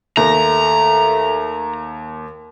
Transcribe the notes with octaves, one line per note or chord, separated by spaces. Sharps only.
D#2 A3 A#5